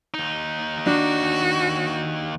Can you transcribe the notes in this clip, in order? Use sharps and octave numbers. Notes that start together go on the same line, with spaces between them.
D#2 D#4
D4 F#4